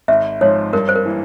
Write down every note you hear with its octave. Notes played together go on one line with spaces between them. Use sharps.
G#1 E5
G#2 F3 C#5
G2 A#4
C5
A#4
E3 A#3